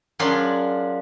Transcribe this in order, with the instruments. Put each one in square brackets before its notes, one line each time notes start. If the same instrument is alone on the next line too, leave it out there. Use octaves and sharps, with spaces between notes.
[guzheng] F#2 F#3 D4 F4 G#4 C6